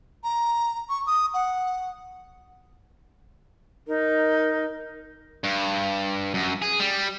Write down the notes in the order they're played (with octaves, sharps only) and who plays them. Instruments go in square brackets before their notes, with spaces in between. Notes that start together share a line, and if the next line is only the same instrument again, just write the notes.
[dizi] A#5
C#6
D#6
F#5
[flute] D#4 [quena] A#4
[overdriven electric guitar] G2
F#2
G#4
G3